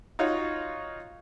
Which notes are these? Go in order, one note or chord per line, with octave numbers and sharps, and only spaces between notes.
D#4 F4 F#4 C#5